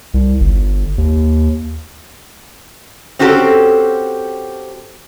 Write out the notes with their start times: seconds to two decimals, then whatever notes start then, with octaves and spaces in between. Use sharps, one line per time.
0.14 C2
0.40 G1
0.98 D#2
3.19 C4 C#4 F#4 G4 A4